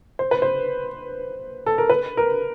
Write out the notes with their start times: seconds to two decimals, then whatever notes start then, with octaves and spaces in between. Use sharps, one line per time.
0.19 C5
0.31 B4
0.42 C5
1.66 A4
1.78 A#4
1.90 B4
2.17 A#4